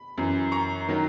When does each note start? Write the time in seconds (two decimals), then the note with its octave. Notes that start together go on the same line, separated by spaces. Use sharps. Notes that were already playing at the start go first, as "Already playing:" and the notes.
Already playing: B5
0.18 F#2 E3
0.52 A#5 C#6
0.88 D#3 F#3